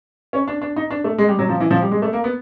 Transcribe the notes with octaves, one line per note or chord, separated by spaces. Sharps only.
C#4
D4
D4
D#4
D4
A3
G#3
G3
F#3
F3
E3
F3
G3
G#3
A3
A#3
B3